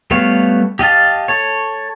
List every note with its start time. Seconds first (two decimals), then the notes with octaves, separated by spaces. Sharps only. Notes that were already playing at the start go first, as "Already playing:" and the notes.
0.11 G3 A3 B3 C#5 F5
0.79 G4 D#5 F5 A5
1.28 A4 C#5